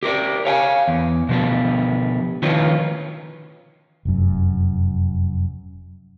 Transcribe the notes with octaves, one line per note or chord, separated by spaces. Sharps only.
G4 A#4 C5 D5
C#5 F5 G5 G#5
E2
B2 F3 G3
D#3 F3 C#4 D#4 F4 B4
F1 F#2